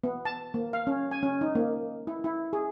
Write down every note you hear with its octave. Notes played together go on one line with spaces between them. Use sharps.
B3
A5
A#3
F5
C#4
G#5
C#4
D#4
A#3
E4
E4
G#4